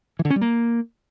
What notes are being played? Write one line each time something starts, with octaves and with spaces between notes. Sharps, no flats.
E3
D3
C#4
G3
A#3